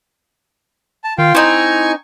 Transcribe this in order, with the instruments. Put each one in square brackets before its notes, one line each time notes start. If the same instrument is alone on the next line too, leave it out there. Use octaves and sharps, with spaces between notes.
[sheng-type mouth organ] A5
[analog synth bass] D#3 [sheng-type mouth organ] F4 F5 G5
[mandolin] C4 D#4 [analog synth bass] E4 [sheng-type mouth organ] G#5 C#6